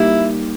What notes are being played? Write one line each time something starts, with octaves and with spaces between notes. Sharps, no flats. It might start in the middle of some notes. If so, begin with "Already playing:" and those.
Already playing: G3 A#3 D#4 E4 G4